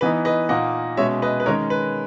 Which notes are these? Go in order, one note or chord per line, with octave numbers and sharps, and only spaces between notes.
E3 B3 D#4 B4 D#5
B4 D#5
A#2 A#3 D#4 D#5 F#5
B2 G#3 C#4 C#5 E5
B4 D#5
B4
D#3 G#3 C#4 A#4 C#5
B4